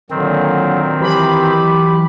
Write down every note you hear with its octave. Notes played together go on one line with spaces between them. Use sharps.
A#2 D3 D#3 F#3 C4
E3 F#3 G4 B5